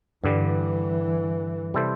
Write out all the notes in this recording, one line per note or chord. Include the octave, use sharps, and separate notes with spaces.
G2 D3 E3 G3
C3 G3 E4 A4 C5